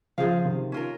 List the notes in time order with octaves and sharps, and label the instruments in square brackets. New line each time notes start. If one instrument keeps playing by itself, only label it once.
[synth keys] C#3 F3 [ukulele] F4 G#4 C5 F5
[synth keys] C3 D#3
[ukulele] C#4 F4 A#4